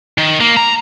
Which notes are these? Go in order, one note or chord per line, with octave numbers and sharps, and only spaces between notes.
D#3
A#3
A#5